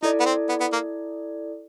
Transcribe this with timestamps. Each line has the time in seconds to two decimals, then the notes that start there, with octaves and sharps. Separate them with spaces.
0.03 D#4 E4 A4 D5
0.20 B3
0.25 C4
0.49 B3
0.60 B3
0.73 A#3